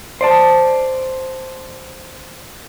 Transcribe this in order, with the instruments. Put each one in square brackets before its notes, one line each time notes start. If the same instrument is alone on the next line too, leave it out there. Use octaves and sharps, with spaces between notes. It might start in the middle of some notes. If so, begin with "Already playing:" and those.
[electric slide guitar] C5 D5 A5